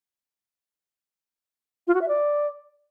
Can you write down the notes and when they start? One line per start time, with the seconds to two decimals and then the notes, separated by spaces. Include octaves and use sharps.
1.87 F4
1.94 F#4
2.01 E5
2.08 D5